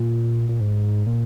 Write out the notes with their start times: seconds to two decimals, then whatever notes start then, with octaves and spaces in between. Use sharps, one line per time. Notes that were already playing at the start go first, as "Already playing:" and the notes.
Already playing: A#2
0.49 A#2
0.61 G#2
1.06 A#2